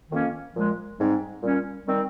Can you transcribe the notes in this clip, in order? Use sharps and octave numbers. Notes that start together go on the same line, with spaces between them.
F2 D#3 A#3 C#4
A#2 F3 G#3
G#2 G3 C4 D#4
A#2 G3 C#4
D#3 G3 C4